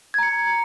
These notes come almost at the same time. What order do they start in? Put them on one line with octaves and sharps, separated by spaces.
G#6 A#5 C#7